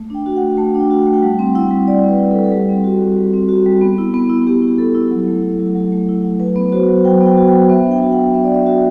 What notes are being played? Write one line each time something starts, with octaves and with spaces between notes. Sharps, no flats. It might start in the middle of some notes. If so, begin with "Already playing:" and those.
Already playing: A3
D4 G5
F#4
F#5
A3
A3 A5
D4
G5
F#4
G5
A3
G5
G3 F#5
C4
E4 F#5
G3
G3 D5
C4
B4
E4
A4
G3
A4
G3 G4
C4
F#4
G3
G3
C4
F#4
G3
B3
E4
B3
E4
B3 G4
E4
B3 A4
E4
F#3
A3
E4
F#3
F#3
A3
E4
F#3
F#3 B4
B3
F#4 C5
F#3
F#3 G5
B3 G5
F#4
G5
F#3
B3 E5
D4
G5
F#4
F#5
B3
B3 E5
D5
D4 E5
F#4 E5